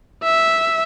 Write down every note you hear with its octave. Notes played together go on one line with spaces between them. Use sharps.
E5